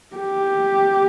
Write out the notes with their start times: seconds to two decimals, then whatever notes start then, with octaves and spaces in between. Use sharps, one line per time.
0.16 G4